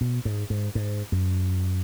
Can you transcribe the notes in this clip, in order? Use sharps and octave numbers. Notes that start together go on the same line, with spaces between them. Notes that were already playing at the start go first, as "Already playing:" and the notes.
B2
G#2
G#2
G#2
F#2